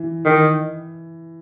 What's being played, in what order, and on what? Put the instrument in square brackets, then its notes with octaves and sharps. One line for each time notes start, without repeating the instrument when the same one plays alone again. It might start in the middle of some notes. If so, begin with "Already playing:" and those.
Already playing: [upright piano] E3
[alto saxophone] D#3